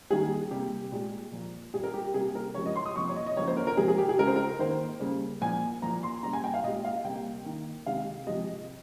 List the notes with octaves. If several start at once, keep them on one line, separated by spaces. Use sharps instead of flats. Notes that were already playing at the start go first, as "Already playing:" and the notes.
D#3 G3 A#3 G#4
C3 G3 A#3 G4
A#2 G#3
A#2 F3 A#3
A#2 G3 A#3 G#4
A#4
G4
G4
C3 G3 A#3 G#4
A#4
C#3 F3 G#3 C#5
D#5
C6
D#6
C3 F3 A#3 C#6
C#5
D#5
D#5
C#3 F3 A#3 C#5
C5
A#4
A#4
C3 F3 G#3 G#4
G#4
G4
G#4
C#3 G#3 A#4
C5
A#4
D#3 A#3 C5
C#3 G3 A#3
A#2 F3 A#3 G#5
A#2 F3 A#3 A#5
C6
C#3 G3 A#3 A#5
G#5
G5
F5
A#2 G#3 D#5
F5
C3 G3 A#3 G5
D#3 A#3
C3 D#3 G#3 F5
C3 F3 G#3 D#5